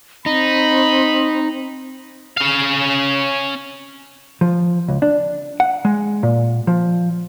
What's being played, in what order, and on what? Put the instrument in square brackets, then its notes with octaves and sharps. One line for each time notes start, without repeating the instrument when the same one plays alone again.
[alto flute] C4 [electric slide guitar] D#4 [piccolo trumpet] B5
[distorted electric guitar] C#4 F5
[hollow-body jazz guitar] F3
C#2
D4
F#5
G#3
A#2
F3